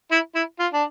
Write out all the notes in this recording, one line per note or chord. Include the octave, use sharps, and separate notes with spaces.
E4
E4
F4
D4